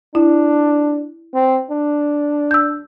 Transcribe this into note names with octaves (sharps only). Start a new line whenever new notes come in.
D4 E4
C4
D4
E6 G6